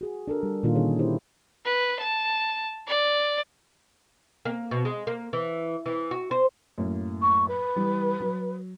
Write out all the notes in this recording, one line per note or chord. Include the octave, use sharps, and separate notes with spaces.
F#4 G#4
D4 A4 A#4
G3
A#2 D#3 A#3 D4 D#4 F4
D3 D#3 C#4 D#4 G#4 C#5
D4 E4 G4 C5
B4
A5
D5
A#3
B2
G#3
A#3
E3
E3
F#4
C5
F#2 A2 A#3
C#6
B4
E3 G3
F#3